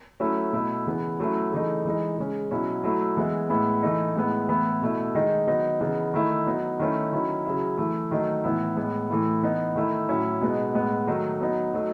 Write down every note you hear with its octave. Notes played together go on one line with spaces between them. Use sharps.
F#3 A3 C#4 E4
B2 A3 E4
C#3 E3 B3
F#3 A3 C#4 E4
C#3 E3 A3 D#4
E3 G#3 D#4
C#3 G#3 C#4
B2 F#3 C#4 E4
F#3 A3 E4
E3 G#3 B3 E4
A2 G#3 B3 E4
E3 A3 D#4
A2 G#3 B3 E4
A2 E3 B3 E4
B2 A3 E4
D#3 G#3 D#4
D#3 F#3 B3 D#4
C#3 E3 B3 D#4
D#3 A3 E4
F#3 B3 D#4
D#3 A3 C#4 E4
D#3 F#3 C#4 E4
C#3 F#3 C#4 E4
E3 A3 E4
D#3 F#3 A3 D#4
A2 E3 B3 E4
A2 G#3 B3
A2 E3 A3 E4
E3 B3 D#4
D#3 A3 E4
A2 F#3 C#4 E4
B2 G#3 B3 D#4
A2 G#3 B3
D#3 F#3 A3 D#4
F#3 B3 D#4
F#3 A3 D#4